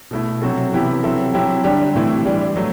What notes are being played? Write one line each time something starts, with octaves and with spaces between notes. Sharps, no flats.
B2 A3 E4
C3 F#3 C4 F#4 A4
C3 E3 B3 E4 G4
F#3 C4 E4 A4
F#3 C4 E4 G4
D3 G3 D4 G4
A2 E3 A3 C4 E4
E3 G3 D4
F#3 A3